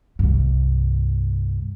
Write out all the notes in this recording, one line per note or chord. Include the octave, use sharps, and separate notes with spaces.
C2 G2